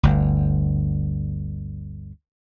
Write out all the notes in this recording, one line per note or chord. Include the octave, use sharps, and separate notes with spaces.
G1 D2